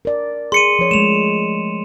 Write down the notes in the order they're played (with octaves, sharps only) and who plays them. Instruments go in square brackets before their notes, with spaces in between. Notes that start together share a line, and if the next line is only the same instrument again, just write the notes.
[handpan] A#4 D5
[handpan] G#4 [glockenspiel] C6 C#7 D#7
[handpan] F3 C#5
[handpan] G#3 A3 [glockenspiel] E7 F7